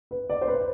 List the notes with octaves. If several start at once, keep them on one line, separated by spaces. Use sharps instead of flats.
B4
D5
C5
B4